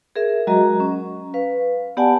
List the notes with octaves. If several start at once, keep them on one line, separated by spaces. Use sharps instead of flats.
G#4 A#4 E5
F#3 G#3 F#4 A#4 D#5 A#5
C#4
B4 F5
B3 G4 D5 F#5 G#5 A5